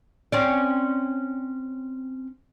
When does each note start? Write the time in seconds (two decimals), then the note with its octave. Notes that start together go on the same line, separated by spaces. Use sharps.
0.32 C4 C#4 D5